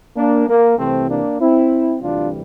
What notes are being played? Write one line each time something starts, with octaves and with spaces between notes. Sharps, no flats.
A#3 D4
A#3
C2 C3 E3 A3 C4
A#3 D4
C4 E4
D2 C3 E3 G3 D4 F4